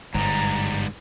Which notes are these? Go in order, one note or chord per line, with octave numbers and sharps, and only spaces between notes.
G1 G#2 G3 A#5